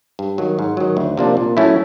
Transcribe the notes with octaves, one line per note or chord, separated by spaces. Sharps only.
G2
D#3 F#3
G#2
D#3 F#3
D2
C3 F3 A#3 D4
A#2
F#3 A3 C#4 E4